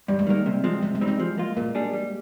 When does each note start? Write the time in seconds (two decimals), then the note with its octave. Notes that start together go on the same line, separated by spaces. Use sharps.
0.08 G2 G3
0.19 G#3
0.27 D#3 G3 A#3
0.46 C3
0.64 F3 G#3 C4
0.83 C3 G#3
0.95 G#3
1.01 G3 C4 D#4
1.08 G#3
1.20 F3
1.38 A#3 F4
1.57 A#2 A#3
1.75 G3 D4 G#4
1.93 G3